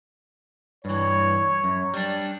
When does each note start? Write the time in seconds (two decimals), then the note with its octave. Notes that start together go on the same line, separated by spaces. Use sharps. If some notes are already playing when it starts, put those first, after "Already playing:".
0.85 G2 E3 C#5
1.64 F#2
1.94 G3 D4